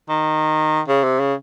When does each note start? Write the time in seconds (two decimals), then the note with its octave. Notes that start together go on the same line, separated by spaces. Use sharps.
0.09 D#3
0.88 C#3
1.04 C3
1.19 C#3